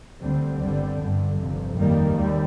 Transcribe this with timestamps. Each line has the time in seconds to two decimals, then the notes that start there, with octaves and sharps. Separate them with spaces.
0.21 D2 D3 G3 C4
0.61 G1 G2 D3 G3
0.99 G1 G2 D3
1.39 G1 F2 C3
1.78 F2 D#3 G3 A#3
2.16 D#2 G3